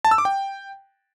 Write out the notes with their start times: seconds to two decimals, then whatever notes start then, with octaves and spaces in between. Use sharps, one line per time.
0.05 A5
0.11 E6
0.18 D6
0.25 G5